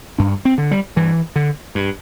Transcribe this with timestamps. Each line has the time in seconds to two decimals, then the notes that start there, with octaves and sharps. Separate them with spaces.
0.18 G2 D4
0.45 C4
0.58 D3
0.71 G3
0.96 G2 E3
1.36 D3
1.75 G2